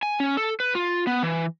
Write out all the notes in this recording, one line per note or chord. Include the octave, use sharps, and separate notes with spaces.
G#5
C#4
A4
B4
F4
B3
E3